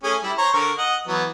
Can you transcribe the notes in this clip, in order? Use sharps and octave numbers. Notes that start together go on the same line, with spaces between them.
A3 C#4 G#4
G3 E4
C5 C#5 A#5
D3 A#4 C#6
D#5 F#5
E3 F#3 B3